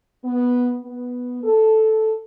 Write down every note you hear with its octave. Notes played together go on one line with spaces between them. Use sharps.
B3
B3
A4